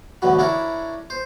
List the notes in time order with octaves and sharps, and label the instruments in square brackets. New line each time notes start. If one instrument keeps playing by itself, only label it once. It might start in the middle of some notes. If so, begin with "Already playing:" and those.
[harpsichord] A1 D2 B2 D3 F#3 B5
D4 E4 A#4 C#5 E5 B5
C5